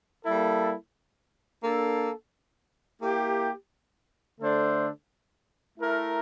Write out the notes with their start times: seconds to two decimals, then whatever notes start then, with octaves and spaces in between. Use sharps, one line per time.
0.25 G3 A#3 E4 A4
1.64 A#3 D4 A4
3.02 A#3 E4 G4
4.40 D3 A3 D4 A4 C5
5.78 A3 E4 A#4